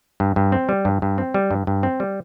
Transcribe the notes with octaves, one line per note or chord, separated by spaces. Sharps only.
G2
G2
C4
G3
G2
G2
C4
G3
G2
G2
C4
G3